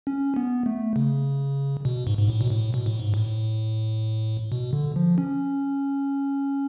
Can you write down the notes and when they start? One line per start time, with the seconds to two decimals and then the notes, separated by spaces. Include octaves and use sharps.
0.07 C#4
0.36 B3
0.66 A3
0.96 C#3
1.85 B2
2.07 G#2
2.18 G#2
2.28 A2
2.41 B2
2.51 A2
2.74 B2
2.86 A2
3.00 G#2
3.14 A2
4.52 B2
4.73 D3
4.96 F3
5.18 C#4